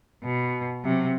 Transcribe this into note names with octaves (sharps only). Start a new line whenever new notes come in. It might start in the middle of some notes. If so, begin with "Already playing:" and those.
B2
C3 F#3